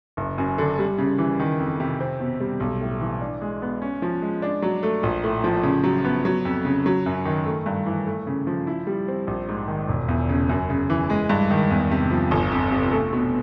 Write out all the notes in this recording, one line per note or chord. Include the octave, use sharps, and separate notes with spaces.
F#1
F#2
D3
G3
C#3
E3
D#3
F2
C3
C4
B2
G3
B1
A2
E3
D4
G#3
B3
C#4
F3
G#3
D4
F#3
A3
A#1
A2
F3
C#3
F#3
B3
F#3
F2
C#3
F#3
F#2
D#3
A3
G2
E3
A3
C#3
F3
E4
G3
C4
A#1
G#2
D#3
E1
E2
C#3
F#2
C#3
E3
G#3
G2
D#3
E2
C3
F3
G1
F2
C3
A3
B2